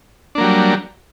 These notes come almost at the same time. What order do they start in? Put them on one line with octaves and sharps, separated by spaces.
D4 A#3 F#3 G3